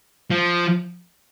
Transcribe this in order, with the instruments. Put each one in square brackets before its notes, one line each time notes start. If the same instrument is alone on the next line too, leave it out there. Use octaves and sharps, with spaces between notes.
[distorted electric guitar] F3